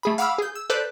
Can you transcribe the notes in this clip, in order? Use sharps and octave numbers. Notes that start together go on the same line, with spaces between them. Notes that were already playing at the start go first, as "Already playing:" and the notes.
A3 G#4 B5
F5 F#5 B5 D6 E6 F6
G#4 G6
E6
A4 B4 C5 D5 F#6 G6